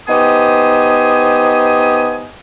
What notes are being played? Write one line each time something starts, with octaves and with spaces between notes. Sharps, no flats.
B3 D#4 G4 C5 G#5 D#6